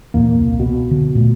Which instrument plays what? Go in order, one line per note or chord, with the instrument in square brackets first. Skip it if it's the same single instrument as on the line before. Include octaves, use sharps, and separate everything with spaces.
[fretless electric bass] E2 A#2 [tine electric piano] A#3
[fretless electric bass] C2
[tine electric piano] B2
[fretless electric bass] D3
A#2 A3